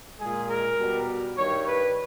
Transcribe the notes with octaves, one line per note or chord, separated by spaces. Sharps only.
A#2 G#3 G#4
A#4
B2 G3
G2 D#3 G3 C#5
B4